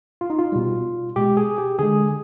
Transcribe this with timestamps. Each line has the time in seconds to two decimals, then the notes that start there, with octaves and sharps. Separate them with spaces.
0.21 F4
0.30 D#4
0.39 F4
0.52 B2 G3
1.16 B2 G#3 G4
1.37 G#4
1.58 G4
1.79 D3 G#3 G#4